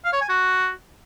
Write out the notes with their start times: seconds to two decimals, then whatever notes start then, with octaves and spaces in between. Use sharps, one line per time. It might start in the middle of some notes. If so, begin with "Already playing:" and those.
0.04 F5
0.13 C#5
0.21 G#5
0.29 F#4